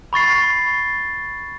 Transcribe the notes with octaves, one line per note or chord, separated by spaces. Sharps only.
B5 C#6 A6 C7